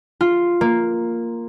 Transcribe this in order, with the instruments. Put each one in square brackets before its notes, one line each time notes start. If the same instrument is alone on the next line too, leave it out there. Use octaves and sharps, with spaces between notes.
[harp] F4
A#3